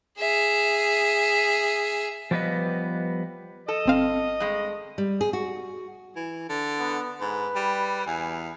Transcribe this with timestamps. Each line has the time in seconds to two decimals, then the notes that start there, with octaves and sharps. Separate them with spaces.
0.19 G#4 E5
2.31 F3 G3 B3 B4 D#5
3.68 A4 D#5
3.86 G1 C4 F5
4.40 G2 G#3
4.98 G3
5.21 G#4
5.33 F#4
6.16 E3
6.49 D3
6.79 B3
7.21 G#2 B4
7.56 G3
8.07 E2 G#5